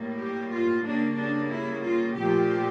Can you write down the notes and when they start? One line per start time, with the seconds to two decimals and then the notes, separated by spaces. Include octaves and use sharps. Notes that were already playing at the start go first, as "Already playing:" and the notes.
Already playing: A2 G3 A#3
0.18 G4
0.50 F4
0.83 C#3 G3 A#3 D4
1.16 D4
1.51 E4
1.83 F4
2.16 A#2 F3 A3 G4